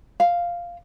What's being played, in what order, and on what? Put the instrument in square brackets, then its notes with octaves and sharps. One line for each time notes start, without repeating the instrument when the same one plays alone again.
[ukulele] F5